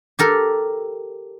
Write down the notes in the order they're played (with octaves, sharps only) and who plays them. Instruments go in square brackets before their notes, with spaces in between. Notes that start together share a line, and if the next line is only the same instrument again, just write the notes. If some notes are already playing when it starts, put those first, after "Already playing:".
[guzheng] G4 A4 A#4